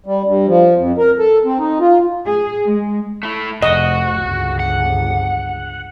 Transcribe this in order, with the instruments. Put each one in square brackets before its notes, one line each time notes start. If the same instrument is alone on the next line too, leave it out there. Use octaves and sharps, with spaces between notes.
[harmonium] G3
G2
F3
F2
A#4
A4
C4
D#4
F4
[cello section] G#4
G#3
[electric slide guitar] A3 E4
[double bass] F1 [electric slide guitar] F#4 [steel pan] D#5
[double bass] G1 C#2
[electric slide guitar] F#5